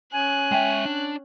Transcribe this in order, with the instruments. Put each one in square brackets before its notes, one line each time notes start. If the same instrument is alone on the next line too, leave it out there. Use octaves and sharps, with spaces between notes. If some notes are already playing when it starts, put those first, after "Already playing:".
[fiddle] C#4 F#6 [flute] G#5
[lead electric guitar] G#3 E5 [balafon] G5
[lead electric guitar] D4